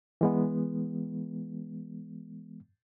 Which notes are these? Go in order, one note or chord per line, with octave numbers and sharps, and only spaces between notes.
E3 G#3 B3